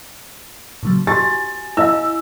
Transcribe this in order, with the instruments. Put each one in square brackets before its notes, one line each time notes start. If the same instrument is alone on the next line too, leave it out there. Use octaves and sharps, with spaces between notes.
[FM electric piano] A#2 C#3 F#3
[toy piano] F#4 G4 [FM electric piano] G#5 [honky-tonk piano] A6
[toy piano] E4 D#5 F5 [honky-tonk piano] E6